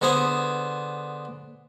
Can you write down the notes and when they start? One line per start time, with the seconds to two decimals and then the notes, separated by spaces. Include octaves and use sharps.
0.01 D3 B3 G#4 C5 G#5